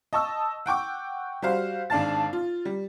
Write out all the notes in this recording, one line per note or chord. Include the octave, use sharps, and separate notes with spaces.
D#5 A5 C#6 E6
F#5 G5 C#6 D6
G3 F#4 C5 F5
G#1 D4 D5 F5 A5 A6
F4
G3